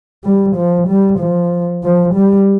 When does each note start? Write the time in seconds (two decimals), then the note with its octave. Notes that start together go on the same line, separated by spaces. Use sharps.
0.24 G3
0.56 F3
0.88 G3
1.19 F3
1.83 F3
2.14 G3